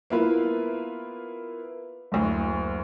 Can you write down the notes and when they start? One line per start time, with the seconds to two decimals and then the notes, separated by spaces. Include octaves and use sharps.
0.10 A#3 B3 E4 F4 B4
2.12 F#1 D2